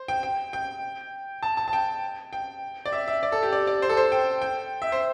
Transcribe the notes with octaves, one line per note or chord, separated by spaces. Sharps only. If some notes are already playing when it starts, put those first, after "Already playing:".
Already playing: C5
G5
G5
G5
A5
A5
A5
G5
G5
D5
E5
E5
D5
A4
G4
D5
D5
C5
A4
C5
G5
G5
E5
C5